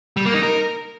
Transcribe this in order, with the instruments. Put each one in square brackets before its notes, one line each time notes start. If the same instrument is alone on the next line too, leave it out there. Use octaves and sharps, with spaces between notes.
[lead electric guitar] G3
A#3
D#4
A#4